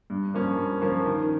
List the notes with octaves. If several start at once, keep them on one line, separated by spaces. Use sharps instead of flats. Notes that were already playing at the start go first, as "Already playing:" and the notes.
G2
F3 A#3 C#4
G2
F3 A#3 C#4
D#3